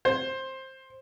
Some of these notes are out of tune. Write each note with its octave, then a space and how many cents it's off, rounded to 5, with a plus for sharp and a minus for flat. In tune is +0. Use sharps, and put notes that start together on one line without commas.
C5 +15